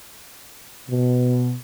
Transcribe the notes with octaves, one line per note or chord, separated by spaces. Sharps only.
B2